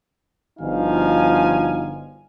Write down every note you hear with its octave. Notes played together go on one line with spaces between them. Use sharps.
G1 F3 D#4 F#4 F5 G#5